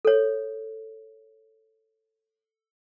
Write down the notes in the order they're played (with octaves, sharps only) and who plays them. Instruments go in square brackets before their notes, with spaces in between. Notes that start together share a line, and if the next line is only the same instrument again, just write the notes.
[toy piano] A4 C#5